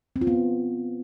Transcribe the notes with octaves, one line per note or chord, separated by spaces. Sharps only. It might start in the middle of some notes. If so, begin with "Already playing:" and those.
C4
F4
B3